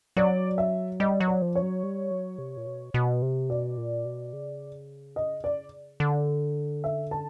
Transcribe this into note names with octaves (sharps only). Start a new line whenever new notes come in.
F#3 D5
E5
G3 D#5
F#3
D5
F3
C#5
F#3
G3
F#3
C3
A#2
B2
B2
C3
B2 D5
A#2
B2
C#3
D#5
D5
D3
E5
A5